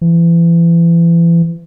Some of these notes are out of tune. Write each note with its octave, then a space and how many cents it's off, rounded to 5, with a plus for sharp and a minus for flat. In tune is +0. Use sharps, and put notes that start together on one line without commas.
E3 +35